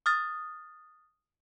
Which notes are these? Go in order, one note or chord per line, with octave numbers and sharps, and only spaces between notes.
D#6 F6 A6